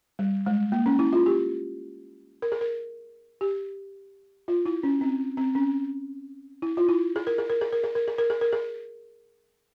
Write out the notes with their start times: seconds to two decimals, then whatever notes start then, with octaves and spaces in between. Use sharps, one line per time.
0.19 G3
0.46 G#3
0.72 A#3
0.86 C#4
0.99 E4
1.13 F4
1.26 G4
2.42 A#4
2.52 G#4
2.61 A#4
3.41 G4
4.48 F4
4.66 E4
4.83 C#4
5.01 C4
5.37 C4
5.55 C#4
6.62 E4
6.77 F4
6.88 E4
7.16 G#4
7.27 A#4
7.38 G#4
7.50 A#4
7.61 G#4
7.73 A#4
7.84 G#4
7.95 A#4
8.08 G#4
8.18 A#4
8.30 G#4
8.41 A#4
8.53 G#4